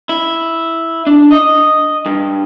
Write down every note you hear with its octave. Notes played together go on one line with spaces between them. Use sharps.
E4
D4
D#5
G2